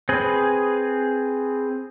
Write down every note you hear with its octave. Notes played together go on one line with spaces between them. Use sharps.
C4 G#4 B4